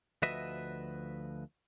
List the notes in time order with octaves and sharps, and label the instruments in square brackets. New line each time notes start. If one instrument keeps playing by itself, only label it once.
[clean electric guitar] D2 F3 F#4 B4 D#5 E5